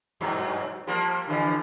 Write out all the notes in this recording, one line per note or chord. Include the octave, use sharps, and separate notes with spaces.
G2 B2 F#3
F3 G3 A#3
D3 E3 F3